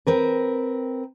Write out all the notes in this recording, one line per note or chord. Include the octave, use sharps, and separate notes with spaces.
C4 A#4 B4